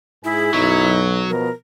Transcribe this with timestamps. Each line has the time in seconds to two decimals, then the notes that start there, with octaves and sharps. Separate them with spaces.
0.24 G#2 E4 G#4
0.54 B1 F#2 F#3 D#4
1.30 B2 F3 B3 A#4